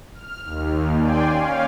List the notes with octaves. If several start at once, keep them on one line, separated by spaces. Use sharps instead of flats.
F6
D#2
D5 G5 G#5 C6
C#4 F5